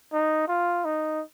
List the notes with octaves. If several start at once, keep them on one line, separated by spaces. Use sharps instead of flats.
D#4
F4
D#4